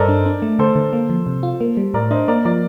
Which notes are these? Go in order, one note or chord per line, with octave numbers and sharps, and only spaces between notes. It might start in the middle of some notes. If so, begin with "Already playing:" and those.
Already playing: G2 A4 A#4 C5 D5 D#5
D4
D4
A3
D3 A4 C5
D3
A#3
F3
C3
F4
A#3
G3
A2 A#4 D5
D4 C5 D#5
A#3 A#4 D5
F3 A#4 D5